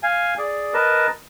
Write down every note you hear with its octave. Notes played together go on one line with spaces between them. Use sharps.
F5 G#5
G#4 D5
A#4 B4 D#5 A5